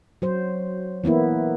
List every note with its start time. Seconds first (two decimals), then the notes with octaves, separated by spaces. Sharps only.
0.22 F#3 C5
1.04 E3 A#3 B3 E4